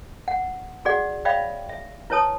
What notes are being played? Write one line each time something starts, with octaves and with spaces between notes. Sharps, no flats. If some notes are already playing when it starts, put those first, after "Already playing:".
F#5
F#4 G#4 D5 F#5
C#5 D5 E5 F5 G5 B5
E5
E4 B4 C#5 A5 D#6